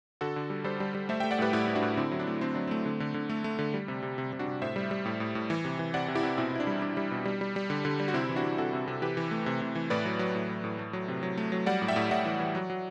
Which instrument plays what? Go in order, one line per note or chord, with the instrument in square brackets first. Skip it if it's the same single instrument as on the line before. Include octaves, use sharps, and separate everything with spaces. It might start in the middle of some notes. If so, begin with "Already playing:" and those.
[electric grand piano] D3 F#4 A4
D3
G3
G3 A4 C5
G3
G3
A3 C5 E5
E5 G5
A3
D5 F#5
A2 G4 B4
A2 E4 G4
A2
D4 F#4
A2
D3 C4 E4
F#3
D4
A3
D3 C4
F#3 D4
A3 C4
D3
D3
D3
A3
A3
D3
G3
C3
C3
C3
C3
D4 F#4
C3
A2 C5 E5
G3
G3
A2
A2
A2
E3
C3
E3
C3 D5 F#5
C3
E4 G4
C3
B2 C4 E4
B2 E4
D4
G3
G3 D4
G3
B2
G3
G3
G3
D3
D3
G3
F#4
C3 C4 E4
E3
D4 F#4
C3
C3 F#4 A4
C3
C3
E3 G4 B4
E3
A3
C3
C3
E3
A2 B4 D5
F#3
F#3
A2
A2
A2
A3
F#3
C3
F#3
A3
F#3
G3 D5 F#5
A2
E5 G5
A2
A2 D5 F#5
E3
E3
F#3
F#3